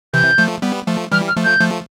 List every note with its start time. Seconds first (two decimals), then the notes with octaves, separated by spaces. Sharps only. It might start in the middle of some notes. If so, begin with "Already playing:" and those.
0.14 C3 E3 G6
0.38 F3 A3
0.62 G3 B3
0.87 F3 A3
1.12 E3 G3 F6
1.28 F6
1.37 F3 A3
1.44 G6
1.61 F3 A3